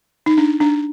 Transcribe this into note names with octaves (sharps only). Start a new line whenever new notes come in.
D#4
D4
D4